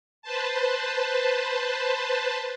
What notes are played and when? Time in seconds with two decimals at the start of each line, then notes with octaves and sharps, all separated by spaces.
0.22 B4 C5 A5